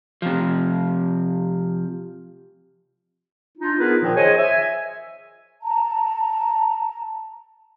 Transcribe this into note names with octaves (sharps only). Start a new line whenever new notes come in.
C3 F3
D4 D#4 F4
B3 D#4 F4 G#4 A#4 B4
A#2 D#3 F3
G#4 C5 C#5 D#5 G#5
E5 G#5
A5 A#5